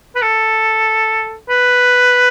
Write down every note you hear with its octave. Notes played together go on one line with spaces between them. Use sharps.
B4
A4
B4